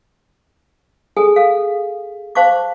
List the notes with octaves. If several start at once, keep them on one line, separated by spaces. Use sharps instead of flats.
G#4 A4 G#5
A4 F5
C5 F5 A5 C#6 D6